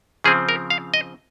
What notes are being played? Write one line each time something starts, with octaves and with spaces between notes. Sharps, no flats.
C#3 F3 C4 G#4
A#4
F5
D#5